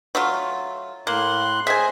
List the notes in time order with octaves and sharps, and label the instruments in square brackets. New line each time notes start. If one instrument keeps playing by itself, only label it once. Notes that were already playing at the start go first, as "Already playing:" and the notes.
[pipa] F#3 A3 F4
[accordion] A2 C6 F#6 [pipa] A#3
[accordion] G#4 C5 D#5 [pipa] E5 G#5